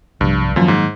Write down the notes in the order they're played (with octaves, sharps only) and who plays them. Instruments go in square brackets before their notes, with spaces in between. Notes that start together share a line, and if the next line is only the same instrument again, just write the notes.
[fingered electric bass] B1 C3 F3 [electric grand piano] G2
[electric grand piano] F#2 F3 [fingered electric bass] D#3 F#3 A#3
[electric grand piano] G#2